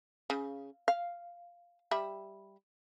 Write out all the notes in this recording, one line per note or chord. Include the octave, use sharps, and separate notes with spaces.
C#3
F5
G3 E5 B5